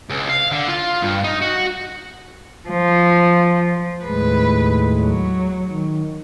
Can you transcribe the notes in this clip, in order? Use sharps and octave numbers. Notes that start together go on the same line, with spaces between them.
C#2
F5
D3
F4
G2
D#4
F#4
F3
D#2 A2 G#3 B4
F#3
D#3